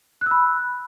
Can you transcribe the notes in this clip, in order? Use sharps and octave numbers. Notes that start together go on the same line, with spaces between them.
B5 E6 F#6